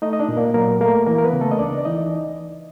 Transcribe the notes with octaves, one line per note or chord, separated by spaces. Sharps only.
A3 D#4 D#5
D#5
D4 D5
A#2
A#3 A#4
F#3 A#3 A#4
A3 A#3 A#4
E3 A#3 A#4
A#4
B3 B4
C#3
A3 A4
D#5
C#2 D4 D5
D5
E3 D#4 D#5